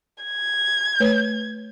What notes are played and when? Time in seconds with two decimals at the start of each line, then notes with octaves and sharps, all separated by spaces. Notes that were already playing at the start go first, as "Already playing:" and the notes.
0.24 G#6
1.00 A3 B4 C#5